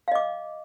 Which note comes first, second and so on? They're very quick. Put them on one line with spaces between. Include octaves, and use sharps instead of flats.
F5 D#5 D6